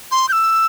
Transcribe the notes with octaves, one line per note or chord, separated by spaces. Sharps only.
C6
G6
E6